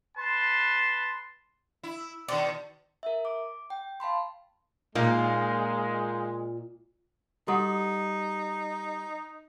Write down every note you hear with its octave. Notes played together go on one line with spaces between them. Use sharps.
B4 A5 C6
E4
B2 D#3 D5
A#4 E5
D6
G5
F5 A5 B5 C6
A#2 G#3 D#4 F5
G3 D#4 F#4 A4 F#5